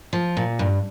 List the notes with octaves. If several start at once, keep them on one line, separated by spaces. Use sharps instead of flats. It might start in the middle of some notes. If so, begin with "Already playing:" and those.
F3
A#2
G2